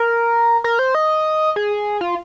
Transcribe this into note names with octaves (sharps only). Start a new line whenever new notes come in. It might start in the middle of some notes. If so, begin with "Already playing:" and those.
Already playing: A#4
A#4
C5
D#5
G#4
F4